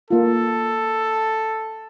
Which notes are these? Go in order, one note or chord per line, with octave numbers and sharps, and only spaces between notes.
A#3 F4 A4